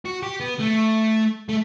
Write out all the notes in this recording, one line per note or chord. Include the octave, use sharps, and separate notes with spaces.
F#4
G4
B3
A3
A3